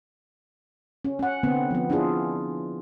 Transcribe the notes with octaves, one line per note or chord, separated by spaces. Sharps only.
C#4
C#4 F#5
D3 B3 C4
F3 B3
D4 E4 F4 G#4